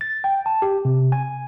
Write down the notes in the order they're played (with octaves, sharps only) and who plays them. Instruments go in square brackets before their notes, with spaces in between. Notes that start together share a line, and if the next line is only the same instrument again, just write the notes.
[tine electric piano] A6
G5
A5
G4
C3
G#5